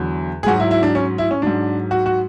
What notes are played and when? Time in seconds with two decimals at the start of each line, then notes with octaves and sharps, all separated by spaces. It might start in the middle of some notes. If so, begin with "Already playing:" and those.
Already playing: E2 D3 F#3
0.43 G#4
0.46 G#2 F#3 F#4
0.60 E4
0.71 E4
0.83 D4
0.95 C#4
1.18 E4
1.31 C#4
1.42 G#2 F#3 D4
1.91 F#4
2.06 F#4